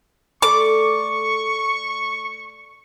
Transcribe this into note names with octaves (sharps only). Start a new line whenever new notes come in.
A3 D5 C#6 D6